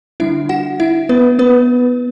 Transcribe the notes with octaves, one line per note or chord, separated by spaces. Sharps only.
D3 G3 D4 E4 E5
F#4 F#5
E4 E5
B3 B4
B3 B4